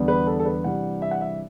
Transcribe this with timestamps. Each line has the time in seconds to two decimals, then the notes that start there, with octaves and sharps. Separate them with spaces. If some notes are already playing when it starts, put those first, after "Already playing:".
Already playing: E2 D3 G3 B3 D4
0.08 B4
0.27 A4
0.39 A4
0.45 B4
0.64 C3 E3 G3 D4 F#5
1.02 E5
1.11 F#5
1.21 E5